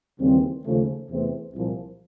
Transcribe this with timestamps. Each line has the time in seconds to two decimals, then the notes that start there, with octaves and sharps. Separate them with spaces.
0.20 D#2 C#3 E3 G3 C4
0.64 D#2 C#3 F3 A3
1.09 E2 C3 E3 A3 C4
1.53 C2 A#2 F3